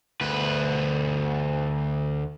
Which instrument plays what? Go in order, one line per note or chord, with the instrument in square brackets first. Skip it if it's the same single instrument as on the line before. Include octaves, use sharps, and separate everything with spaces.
[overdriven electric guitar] D2 B4